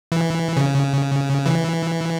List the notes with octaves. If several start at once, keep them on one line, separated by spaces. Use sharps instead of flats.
E3
C#3
E3